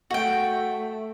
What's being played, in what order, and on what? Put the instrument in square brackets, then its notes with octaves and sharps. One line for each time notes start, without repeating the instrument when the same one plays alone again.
[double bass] A3 [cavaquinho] F#4 G5